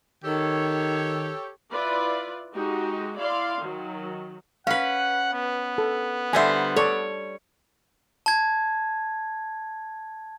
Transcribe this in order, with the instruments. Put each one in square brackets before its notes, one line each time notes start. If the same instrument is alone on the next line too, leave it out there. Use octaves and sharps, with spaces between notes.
[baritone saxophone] D#3 [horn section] G4 A4 C#5
[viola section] E4 F4 B4 D5
G#3 D#4 F#4 G4
E4 D5 F5 C6
D#3 F#3
[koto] C#4 B4 [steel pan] F5 [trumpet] F#5
[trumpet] B3
[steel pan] A4
[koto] D3 G3 C5 [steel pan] E5 G#5
[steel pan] A4 D5 C#6 [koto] C#5
[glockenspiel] A5 G#6